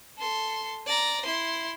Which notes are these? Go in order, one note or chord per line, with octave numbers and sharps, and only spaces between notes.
A4 C6
D5 A#5
E4 C6